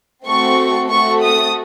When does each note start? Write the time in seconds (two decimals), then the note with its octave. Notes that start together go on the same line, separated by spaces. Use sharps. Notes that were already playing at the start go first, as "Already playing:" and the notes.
0.25 A3 C4 F#4 A4 C#6
0.90 A3 C4 F#4 A4 C#6
1.23 D#6